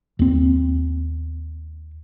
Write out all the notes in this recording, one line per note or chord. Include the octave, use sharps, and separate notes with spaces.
D#2 C4